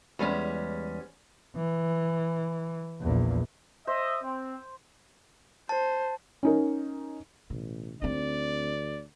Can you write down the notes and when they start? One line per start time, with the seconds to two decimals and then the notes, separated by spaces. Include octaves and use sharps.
0.19 E2 G3 G#3 C#4
1.56 E3
3.01 A#1 E2
3.87 C5 D#5 E5
4.23 C4
5.69 C5 A5
6.43 C#4 D#4 A#4
7.50 A1 B2
8.02 D2 C4 D#4 D5